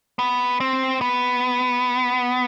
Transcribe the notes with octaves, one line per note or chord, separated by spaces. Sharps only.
B3
C4
B3